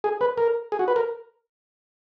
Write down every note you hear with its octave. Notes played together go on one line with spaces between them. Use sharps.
G#4
B4
A#4
G#4
F#4
B4
A#4